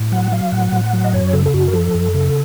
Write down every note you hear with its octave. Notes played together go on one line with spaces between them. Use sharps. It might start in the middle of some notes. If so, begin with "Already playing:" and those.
Already playing: A2
F#3 F#5
F#3 F5
A2 F#5
A2
F#3
D#5
F#2 C#5
C#3 A4
A4
F#2 F#4
A#4
F3 A4
F#2
C#3